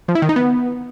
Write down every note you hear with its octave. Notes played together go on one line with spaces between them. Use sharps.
F3
E4
D#3
D#4
B3